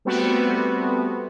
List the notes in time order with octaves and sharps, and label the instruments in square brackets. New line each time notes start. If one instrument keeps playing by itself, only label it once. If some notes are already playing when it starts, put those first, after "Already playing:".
[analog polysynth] G3 A3 B3 C4 F#4